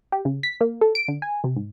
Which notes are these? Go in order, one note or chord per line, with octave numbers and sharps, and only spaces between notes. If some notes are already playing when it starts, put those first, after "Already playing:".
G4
C#3
B6
A#3
A4
D7
D3
G#5
C3
G#2